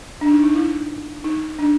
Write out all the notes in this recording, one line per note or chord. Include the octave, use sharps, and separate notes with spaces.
D4
D#4
D#4
E4
D#4
D4